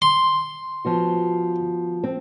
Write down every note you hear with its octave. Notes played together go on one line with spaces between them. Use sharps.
C6
F3 B3 F#4
C4